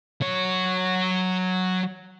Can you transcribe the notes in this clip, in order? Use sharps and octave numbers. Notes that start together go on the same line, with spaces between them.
F#3 C#5